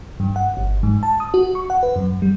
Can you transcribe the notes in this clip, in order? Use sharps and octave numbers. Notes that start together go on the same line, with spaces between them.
G2
F#5
G1
G#2
A5
D#6
F#4
C#6
F#5
B4
F#2
G3